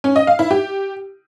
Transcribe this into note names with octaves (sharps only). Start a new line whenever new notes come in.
C#4
D#5
F5
E4
G4